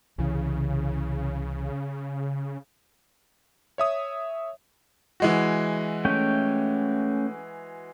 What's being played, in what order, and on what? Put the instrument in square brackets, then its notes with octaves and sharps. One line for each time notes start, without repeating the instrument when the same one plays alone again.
[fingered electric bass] C2 E3 [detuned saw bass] C#3
[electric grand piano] C#5 E5 D#6
[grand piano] E3 G#3 F#4
[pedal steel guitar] A3 C#4 G5